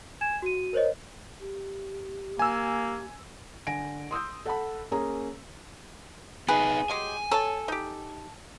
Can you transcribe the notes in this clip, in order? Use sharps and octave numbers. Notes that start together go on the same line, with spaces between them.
G#5 G#6 E7
F#4 D#7
A#4 C5 C#5 D#5
G4
A#3 G#5 E6
D3 G#5 A#6 D7
C6 D#6 E6 G6
A4 F#5 A5 B5
A#3 C#4 G#4 A#5
B3 D#4 G#4 B4
F#3 G#3 G4 G#5
A4 C#5 A5
D#4 G4